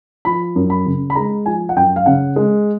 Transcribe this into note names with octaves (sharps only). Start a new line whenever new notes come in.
F3 B5
F#2
B5
C#3
B5
G#3 A#5
F3 G#5
F#5
F#2 G5
F5
C#3 F#5
G#3